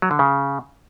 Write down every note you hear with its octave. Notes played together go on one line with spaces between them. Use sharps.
F#3
D3
C#3